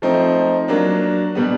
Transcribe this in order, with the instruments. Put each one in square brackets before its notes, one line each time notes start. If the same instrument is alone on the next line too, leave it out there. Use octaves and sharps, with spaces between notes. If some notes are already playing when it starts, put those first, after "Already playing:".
[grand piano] F3 A3 C4 D#4
F#3 A#3 D4
B2 G3 B3